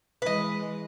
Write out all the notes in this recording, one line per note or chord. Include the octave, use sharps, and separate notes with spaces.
E3 G#3 B4 D#5